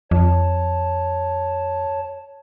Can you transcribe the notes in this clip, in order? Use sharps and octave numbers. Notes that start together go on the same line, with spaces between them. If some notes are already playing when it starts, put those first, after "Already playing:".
F2 C#5 A5